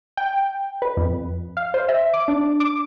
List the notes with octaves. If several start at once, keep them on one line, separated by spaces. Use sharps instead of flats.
G5
B4
F2
F5
C5
E5
D6
D4
D6